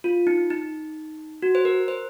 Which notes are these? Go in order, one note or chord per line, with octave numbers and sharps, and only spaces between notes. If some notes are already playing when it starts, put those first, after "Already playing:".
F4
D#4
D#4
F#4
C5
A#4
C5